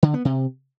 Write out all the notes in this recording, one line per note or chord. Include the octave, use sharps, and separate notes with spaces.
D3
B3
C3